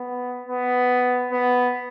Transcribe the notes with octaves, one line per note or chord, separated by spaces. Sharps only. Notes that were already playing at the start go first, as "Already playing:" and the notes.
Already playing: B3
B3
B3